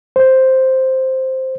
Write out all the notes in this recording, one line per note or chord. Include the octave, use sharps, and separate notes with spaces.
C5